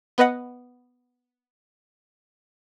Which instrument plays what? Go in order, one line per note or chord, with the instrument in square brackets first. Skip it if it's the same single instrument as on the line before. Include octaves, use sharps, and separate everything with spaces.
[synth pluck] B3 B4 D#5 F#5